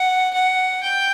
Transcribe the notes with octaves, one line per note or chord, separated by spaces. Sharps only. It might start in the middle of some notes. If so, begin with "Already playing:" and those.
Already playing: F#5
F#5
G5